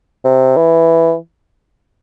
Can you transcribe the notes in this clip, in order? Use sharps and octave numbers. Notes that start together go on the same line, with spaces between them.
C3
E3